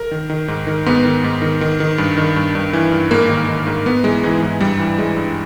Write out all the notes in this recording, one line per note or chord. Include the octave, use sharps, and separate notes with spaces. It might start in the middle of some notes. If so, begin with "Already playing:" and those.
Already playing: A#4
D#3
D#3
G#2
D#3
G#2 B3
D#3
G#2
D#3
D#3
D#3
G2
D#3
G2
G2
E3
G2
G#2 A#3
D#3
D#3
G#2
G#2 B3
E3 G#3
G#2 E3
G#2 E3
G2 G3
E3
E3 G#3
G2